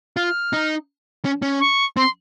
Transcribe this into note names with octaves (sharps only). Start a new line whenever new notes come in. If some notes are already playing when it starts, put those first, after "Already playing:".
F4 F6
D#4
C#4
C#4
C#6
C4 C6